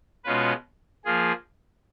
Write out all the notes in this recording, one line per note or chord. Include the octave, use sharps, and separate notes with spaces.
B2 G#3 C#4 F4 B4
F3 A#3 F4 G#4